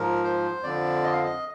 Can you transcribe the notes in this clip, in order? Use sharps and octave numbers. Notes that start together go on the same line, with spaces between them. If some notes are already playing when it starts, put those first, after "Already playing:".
Already playing: G#2 F3 A#4
C5
F2 D3 F3 D5
D#5
F5
D#5